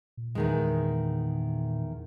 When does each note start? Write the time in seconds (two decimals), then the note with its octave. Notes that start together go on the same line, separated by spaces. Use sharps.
0.17 A#2
0.35 E2 D#3 G#3